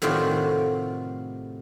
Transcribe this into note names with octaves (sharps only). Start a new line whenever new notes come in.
A2 C3 D#3 F4 F#4 D5